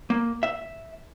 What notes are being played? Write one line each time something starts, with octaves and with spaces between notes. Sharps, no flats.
A#3
E5